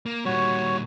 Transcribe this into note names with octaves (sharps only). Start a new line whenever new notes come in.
A#3
A#2 G3 F#4 C#5